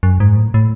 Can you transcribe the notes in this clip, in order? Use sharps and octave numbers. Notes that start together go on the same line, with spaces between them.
F#2
G#2
A2
A2